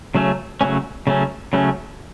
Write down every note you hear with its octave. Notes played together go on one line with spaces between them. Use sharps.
C#3 F#3 A3 C#4
C#3 F#3 A3 C#4
C#3 F#3 A3 C#4
C#3 F#3 A3 C#4